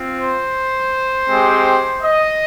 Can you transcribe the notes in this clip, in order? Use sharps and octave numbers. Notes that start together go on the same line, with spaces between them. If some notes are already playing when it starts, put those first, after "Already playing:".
Already playing: C4 F4
C5
G#3 C4 G4
D#5